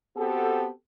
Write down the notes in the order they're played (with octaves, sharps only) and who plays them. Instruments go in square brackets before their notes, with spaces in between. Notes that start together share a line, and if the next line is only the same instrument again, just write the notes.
[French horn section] B3 C4 F#4 G4 A4